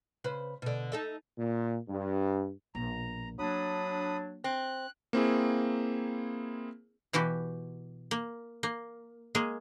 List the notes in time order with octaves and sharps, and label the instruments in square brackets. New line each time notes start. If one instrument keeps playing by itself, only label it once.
[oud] C#3 B4 C5
B2 D3
D#4 A4 E5
[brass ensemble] A#2
G2
[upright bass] A#1 B2 [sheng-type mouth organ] A#5
[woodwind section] F#3 D4 [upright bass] A#3 [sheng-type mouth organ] B5 D#6
[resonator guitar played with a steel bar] C4 [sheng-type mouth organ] F#6
[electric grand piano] A#3 C4 E4 G#4
[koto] B2 E3 F#4 G4
A#3
A#3
G#3 A#3 G#4